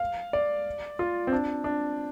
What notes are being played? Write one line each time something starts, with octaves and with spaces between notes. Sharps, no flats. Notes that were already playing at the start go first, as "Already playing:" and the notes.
Already playing: F5
D5
F4
C4
D4
D4